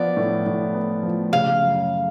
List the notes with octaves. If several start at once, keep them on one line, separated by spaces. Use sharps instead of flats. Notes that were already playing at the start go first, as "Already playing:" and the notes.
Already playing: F3 B3 D5
A2
A2
B3
F3
C#3 F5
F#2